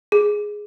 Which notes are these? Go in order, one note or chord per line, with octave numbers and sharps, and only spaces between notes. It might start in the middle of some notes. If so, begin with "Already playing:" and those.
G#4